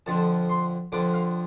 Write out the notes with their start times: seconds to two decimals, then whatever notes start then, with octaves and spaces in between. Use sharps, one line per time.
0.06 F2 D3 F3 A5
0.49 C6
0.92 F2 D3 F3 D6
1.14 F5